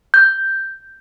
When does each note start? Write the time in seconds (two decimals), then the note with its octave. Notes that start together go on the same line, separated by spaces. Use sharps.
0.14 G6